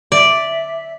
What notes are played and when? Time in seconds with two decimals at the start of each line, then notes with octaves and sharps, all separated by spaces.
0.12 D5 E5